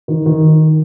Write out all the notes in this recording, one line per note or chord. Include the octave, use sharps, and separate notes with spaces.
D#3
D#3